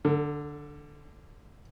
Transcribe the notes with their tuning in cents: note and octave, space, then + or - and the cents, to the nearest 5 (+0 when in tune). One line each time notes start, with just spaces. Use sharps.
D3 +0 A4 +45